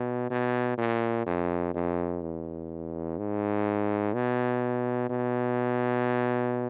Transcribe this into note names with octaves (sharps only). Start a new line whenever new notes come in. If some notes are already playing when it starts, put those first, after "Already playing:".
Already playing: B2
B2
A#2
F2
F2
E2
G#2
B2
B2